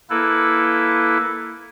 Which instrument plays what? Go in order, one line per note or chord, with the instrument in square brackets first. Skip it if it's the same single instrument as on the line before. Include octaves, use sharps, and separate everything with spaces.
[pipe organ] A#3 E4 A4 B4